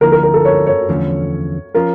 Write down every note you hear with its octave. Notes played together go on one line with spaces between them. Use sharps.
D2 D3 F3 A#3 E4 A#4
A#4
A#4
A4
C#5
C#5
E2 D3 F3 A3 C#4
F3 C#4 F4 A#4